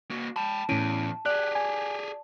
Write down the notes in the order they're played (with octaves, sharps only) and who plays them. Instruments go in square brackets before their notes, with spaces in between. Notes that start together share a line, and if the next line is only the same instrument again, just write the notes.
[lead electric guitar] A#3 F#4
[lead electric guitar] G5 B5 [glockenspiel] A5
[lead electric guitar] E2 [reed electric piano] A2 C#4 [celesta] E4 D7 D#7
[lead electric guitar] G4 G#4 [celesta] D5 [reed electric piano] F#6
[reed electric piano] G#5